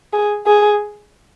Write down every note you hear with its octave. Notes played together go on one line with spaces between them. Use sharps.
G#4
G#4